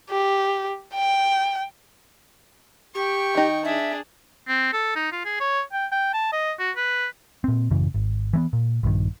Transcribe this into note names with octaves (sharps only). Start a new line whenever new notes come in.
G4
G5
G4 G5 C#6
D#3 D#4
D4 G#4 E5
C4
A4
D#4
F4
G#4
C#5
G5
G5
A5
D#5
F#4
B4
A#2 C4
A1 F#2 C#3 E3
G#1
E3 A#3 B3
A#2
A#1 G2 D#3